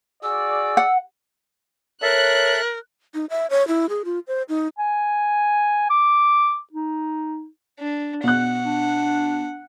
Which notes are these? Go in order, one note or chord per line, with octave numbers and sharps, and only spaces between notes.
F#4 G#4 D5 E6
F#5
A4 A#4 C#5 E5 F#6
D#4
E5
C#5
E4
G#4
F4
C5
D#4
G#5
D6
D#4
D4
B2 F#5 F#6
D4